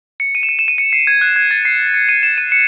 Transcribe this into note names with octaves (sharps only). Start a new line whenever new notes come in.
C#7
D#7
E7
D#7
E7
D#7
C#7
C7
G#6
F#6
G#6
A6
C7
C#7
D#7
E7
D#7
C#7